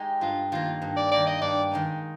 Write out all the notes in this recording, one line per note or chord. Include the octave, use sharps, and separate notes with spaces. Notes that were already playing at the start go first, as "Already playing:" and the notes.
Already playing: G#3 D#4 G4
G2 F4
D#3 A#3 F4
G2
D5
D#3 A#3 D5
D#5
G2 D5
D#3 G#3 D#4